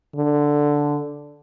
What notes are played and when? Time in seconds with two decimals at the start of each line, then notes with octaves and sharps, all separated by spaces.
0.15 D3